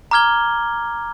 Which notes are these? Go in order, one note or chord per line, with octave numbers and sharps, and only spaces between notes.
A#5 D6 F6 G#6 G7